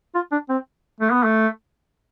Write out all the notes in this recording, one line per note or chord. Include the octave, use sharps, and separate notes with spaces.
F4
D4
C4
A3
B3
A3